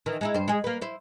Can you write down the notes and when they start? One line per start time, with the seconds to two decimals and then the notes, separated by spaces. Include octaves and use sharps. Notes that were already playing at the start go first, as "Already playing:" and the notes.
0.06 D#3 E3
0.21 G#3 D#4 E4
0.34 G2 C5
0.48 G#3 G#4
0.64 A#3 B4
0.81 E4 C5